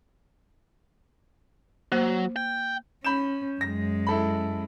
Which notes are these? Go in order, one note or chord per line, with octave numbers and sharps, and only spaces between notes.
F#3 A#3 C5
G5
C#4 B5 G6 E7
F#2 G#3 A#6
E4 A4 B5